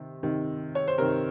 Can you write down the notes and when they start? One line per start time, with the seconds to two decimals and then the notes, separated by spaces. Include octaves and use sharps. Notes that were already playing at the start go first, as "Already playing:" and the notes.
Already playing: C3 D#3
0.23 C3 D#3
0.75 C#5
0.88 C5
0.98 C3 D#3 A#4